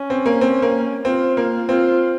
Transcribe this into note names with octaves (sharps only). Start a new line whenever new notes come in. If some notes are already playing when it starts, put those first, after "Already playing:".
Already playing: C#4
C4
A#3
C4
A#3
C4 F4
A#3
C4 F4